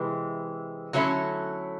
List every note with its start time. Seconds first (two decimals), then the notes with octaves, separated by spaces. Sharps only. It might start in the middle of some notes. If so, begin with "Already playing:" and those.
Already playing: C3 E3 G#3
0.93 D3 F#3 A3 C#4 E4